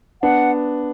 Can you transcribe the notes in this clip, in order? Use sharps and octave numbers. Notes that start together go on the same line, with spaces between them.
B3 D4 F#5